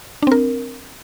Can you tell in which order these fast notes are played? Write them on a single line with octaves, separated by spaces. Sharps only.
D4 C4 A#4